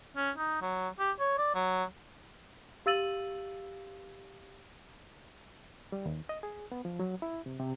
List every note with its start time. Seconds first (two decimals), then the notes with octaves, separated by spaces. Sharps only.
0.16 C#4
0.38 D#4
0.61 F#3
0.99 G4
1.19 C#5
1.38 D5
1.55 F#3
2.86 G4 F5 E6 A6 D#7 F#7
5.92 G3
6.06 D#2
6.29 D#5
6.43 G#4
6.72 B3
6.85 F3
7.00 F#3
7.22 E4
7.46 C3
7.60 C3